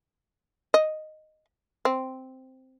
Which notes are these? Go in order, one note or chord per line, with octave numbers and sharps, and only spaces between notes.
D#5
C4